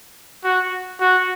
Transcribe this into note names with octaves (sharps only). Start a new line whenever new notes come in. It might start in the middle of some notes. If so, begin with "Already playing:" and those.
F#4
F#4